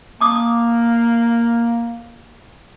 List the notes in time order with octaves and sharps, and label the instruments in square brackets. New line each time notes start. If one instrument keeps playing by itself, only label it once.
[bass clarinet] A#3 [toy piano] A5 D6 D#6